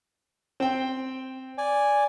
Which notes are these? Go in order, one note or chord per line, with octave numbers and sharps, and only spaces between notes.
C4 G5
D5 G#5